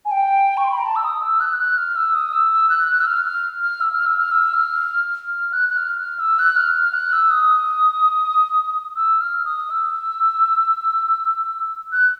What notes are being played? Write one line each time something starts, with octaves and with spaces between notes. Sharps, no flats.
G#5
G5
C#6
C6
B5
A#5
A5
E6
D#6
E6
F#6
F#6
F6
E6
D#6
E6
E6
F#6
F#6
E6
F6
F6
F6
E6
F6
E6
F6
E6
F6
F6
F#6
F#6
F6
F6
E6
F#6
F6
F6
F#6
E6
D#6
E6
F6
D#6
E6
F#6